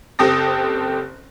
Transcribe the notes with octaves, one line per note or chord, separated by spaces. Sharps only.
F#1 C4 G4 A4 D#6 A#6